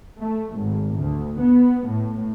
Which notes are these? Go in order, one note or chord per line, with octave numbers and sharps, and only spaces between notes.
A3
G#1
D2
B3
A2